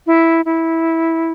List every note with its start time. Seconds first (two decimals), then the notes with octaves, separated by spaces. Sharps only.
0.07 E4
0.45 E4